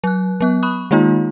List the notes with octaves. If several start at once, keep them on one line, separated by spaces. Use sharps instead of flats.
F#3 F#6
F#3 B3 F#6
B5 C#6 D#6 F#6
D#3 G#3 A#3 D#4 F4